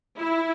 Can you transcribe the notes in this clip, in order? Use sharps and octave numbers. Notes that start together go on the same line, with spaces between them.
E4